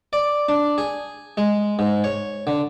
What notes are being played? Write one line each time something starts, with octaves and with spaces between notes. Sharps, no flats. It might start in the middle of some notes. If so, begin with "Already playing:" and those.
D5
D4
G#4
G#3
G#2
C#5
D3